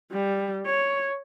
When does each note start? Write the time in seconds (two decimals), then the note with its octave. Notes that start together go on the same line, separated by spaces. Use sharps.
0.12 G3
0.66 C#5